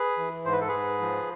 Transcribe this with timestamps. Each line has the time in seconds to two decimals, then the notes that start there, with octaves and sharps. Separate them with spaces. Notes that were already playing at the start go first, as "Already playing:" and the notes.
Already playing: G#4 B4
0.17 E3
0.45 G#2 C5
0.52 B4
0.60 A4
0.68 G#2 G#4 B4
1.01 F3